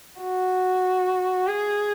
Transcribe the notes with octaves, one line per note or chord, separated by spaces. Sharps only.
F#4
G#4